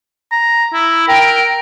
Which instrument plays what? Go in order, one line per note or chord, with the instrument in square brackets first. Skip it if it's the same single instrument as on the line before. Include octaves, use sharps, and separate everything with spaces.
[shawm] A#5
E4
[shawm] A#4 [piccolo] G5